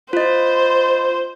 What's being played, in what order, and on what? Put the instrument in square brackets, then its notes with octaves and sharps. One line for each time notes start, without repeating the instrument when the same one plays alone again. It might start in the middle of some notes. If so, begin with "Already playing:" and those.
[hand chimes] F4 D#5 [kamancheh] C5